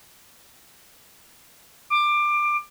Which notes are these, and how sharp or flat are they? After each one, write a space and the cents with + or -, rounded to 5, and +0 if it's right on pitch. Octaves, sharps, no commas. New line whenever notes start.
D6 +20